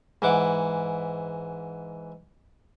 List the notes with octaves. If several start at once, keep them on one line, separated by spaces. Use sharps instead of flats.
G#2 E3 F#5 D6